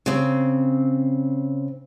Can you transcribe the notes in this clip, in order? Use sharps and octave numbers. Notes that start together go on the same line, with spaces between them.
C#3 C4